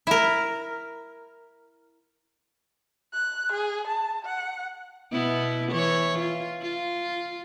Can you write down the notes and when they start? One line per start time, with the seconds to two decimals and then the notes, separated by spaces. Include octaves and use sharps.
0.07 E4 A#4
3.14 F#6
3.52 G#4
3.87 A5
4.25 F#5
5.12 B2 B3 E4
5.72 E3 C#5
6.19 F4
6.62 F4